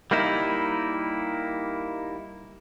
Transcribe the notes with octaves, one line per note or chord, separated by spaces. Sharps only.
G3 A#3 D#4 E4